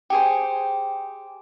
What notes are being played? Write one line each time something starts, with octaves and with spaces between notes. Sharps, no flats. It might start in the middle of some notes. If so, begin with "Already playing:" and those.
G4 G#4 C5 G5